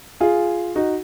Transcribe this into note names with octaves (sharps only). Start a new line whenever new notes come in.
F4 G#4
D#4 F#4